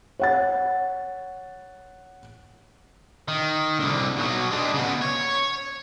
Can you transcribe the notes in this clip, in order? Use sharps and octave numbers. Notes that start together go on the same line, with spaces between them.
C#5 F#5 A6
D#3
C2 D3
B2 F#3
G#3 D4
C#3 B3
C#5